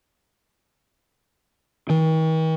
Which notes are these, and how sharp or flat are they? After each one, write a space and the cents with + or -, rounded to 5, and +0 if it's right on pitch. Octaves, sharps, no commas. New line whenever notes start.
D#3 +45